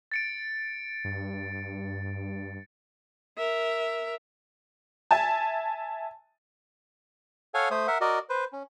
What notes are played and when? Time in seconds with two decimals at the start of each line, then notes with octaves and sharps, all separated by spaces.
0.12 A6 C#7 D7
1.05 G2
3.38 A#4 E5
5.11 E5 G#5 A5
7.54 A4 C#5 F5 F#5 G#5
7.71 A3 C5 D#6
7.88 A#4 E5 F#5
8.01 F#4 A#4 D5 D#5
8.29 B4 C5
8.53 C#4